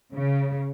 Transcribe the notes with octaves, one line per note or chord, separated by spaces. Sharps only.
C#3